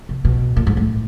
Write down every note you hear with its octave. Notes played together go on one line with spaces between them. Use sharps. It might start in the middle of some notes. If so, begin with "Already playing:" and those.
C3
B2
A#2
G#2
A2